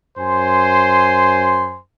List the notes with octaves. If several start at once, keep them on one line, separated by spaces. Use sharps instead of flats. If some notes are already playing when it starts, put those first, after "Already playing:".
F#2 C5 G#5 C6